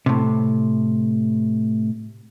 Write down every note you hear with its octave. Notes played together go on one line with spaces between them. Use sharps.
A2 C3